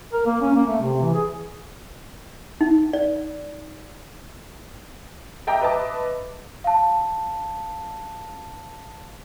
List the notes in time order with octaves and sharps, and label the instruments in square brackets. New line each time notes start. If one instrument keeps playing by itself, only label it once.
[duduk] A#4
A#3
C#4
A#3
A3
C3
E3
G#4
[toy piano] D#4
D5
[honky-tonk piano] D#5 E5 G5 A5 A#5 D6
B4 D#5 E5 A5 D6
[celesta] F5 A5